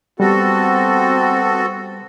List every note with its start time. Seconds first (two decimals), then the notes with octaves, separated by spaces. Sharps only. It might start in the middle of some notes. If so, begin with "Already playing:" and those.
0.20 G3 B3 C4 F#4 A4